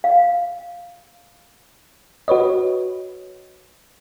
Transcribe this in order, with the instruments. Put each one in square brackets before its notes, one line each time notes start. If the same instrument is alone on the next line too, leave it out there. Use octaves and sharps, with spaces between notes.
[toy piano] F5
[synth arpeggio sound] F#4 B4 C#5 D#5